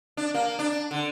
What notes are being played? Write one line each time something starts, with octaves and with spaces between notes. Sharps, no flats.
D4
A#3
D4
D3